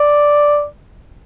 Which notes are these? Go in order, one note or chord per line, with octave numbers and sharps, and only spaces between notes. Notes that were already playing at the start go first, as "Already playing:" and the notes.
Already playing: D5